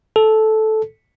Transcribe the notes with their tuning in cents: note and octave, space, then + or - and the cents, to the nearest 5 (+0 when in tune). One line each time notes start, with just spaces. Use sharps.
A4 -10